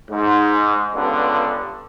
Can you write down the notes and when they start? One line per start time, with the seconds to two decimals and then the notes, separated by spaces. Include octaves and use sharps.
0.10 G#2
0.95 C#2 G2 D3 B3 D4